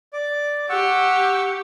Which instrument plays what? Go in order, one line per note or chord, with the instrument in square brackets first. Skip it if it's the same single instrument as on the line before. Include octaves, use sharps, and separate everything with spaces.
[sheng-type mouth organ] D5 D6
[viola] G4 [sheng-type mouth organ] F#5 C#6 E6